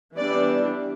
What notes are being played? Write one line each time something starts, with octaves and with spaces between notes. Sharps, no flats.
E3 G3 B3 D4 D5